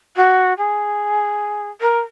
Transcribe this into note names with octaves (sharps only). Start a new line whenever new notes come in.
F#4
G#4
A#4